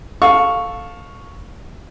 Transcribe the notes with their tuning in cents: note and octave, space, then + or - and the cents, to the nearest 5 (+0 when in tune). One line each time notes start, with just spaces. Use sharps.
A4 +0 F5 +15 C#6 +0